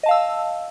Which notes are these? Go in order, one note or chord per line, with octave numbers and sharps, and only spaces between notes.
D#5 F5 A5 E6